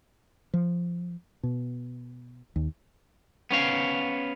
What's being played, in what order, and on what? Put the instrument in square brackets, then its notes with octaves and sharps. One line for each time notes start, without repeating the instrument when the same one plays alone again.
[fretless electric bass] F3
B2
D#2
[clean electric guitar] B3 C#4 F5